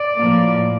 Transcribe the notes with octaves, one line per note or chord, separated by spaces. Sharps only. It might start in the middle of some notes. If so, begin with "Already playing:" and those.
Already playing: D5
A2 F3 A#3